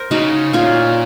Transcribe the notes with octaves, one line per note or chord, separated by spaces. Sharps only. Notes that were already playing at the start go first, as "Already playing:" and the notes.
Already playing: A#4 C5
C#3 D#4 F#4
A#2 C#4 F4